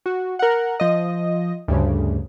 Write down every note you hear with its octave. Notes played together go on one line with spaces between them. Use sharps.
F#4
A#4 F#5
F3 D#5
D2 G2 C#3